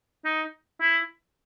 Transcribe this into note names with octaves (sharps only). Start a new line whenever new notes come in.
D#4
E4